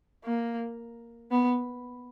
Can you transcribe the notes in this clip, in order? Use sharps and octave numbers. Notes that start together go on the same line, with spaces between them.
A#3
B3